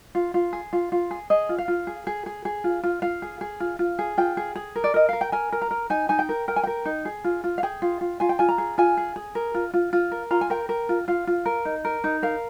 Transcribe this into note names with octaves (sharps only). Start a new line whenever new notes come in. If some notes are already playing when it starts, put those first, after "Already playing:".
F4
F4
G#4
F4
F4
G#4
G#4 D#5
F4
F5
F4
G#4
G#4
G#4
G#4
F4
F4
F4 F5
G#4
G#4
F4
F4
G#4
F4 G5
G#4
G#4
A#4
D5
A#4 D#5
A#4 F5
G5
A#4 G#5
A#4
A#5
A#4
D#4 G#5
D#4 G#5
G5
A#4
A#4 G5
G#5
A#4 G5
D#4
G#4
F4
F4
F5
G#4 G5
F4
F4
F4 G#5
G5
F4 G#5
A#5
G#4
F4 G#5
G#4
G#4
A#4
F4
F4
F4
A#4
F4 A#5
G#5
A#4 G5
A#4
F4
F4 F5
F4
A#4
D#4
A#4
D#4
A#4 F5